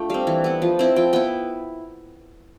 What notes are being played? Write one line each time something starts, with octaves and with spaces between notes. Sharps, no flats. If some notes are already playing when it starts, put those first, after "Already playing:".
Already playing: A3 D4 F4 G5
G3 C4 F5
E3
B3 E4
F3
C4 E4
F3 G5
B3 E4 G5